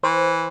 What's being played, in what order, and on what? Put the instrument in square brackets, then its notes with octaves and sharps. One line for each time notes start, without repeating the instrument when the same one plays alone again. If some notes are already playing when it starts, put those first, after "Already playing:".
[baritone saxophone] E3 [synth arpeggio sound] C5